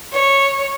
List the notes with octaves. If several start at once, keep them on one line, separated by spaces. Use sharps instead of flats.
C#5